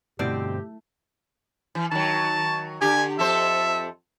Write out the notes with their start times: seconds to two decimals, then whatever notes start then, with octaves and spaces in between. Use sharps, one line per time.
0.19 G2 B2 D3 A3 C4 E4 G4 D5
1.75 E3
1.91 D#3 F#3 A5
2.81 D3 G4 G#5
3.19 F2 A4 C5 E5